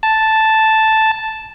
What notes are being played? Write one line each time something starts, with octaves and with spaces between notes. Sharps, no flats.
A5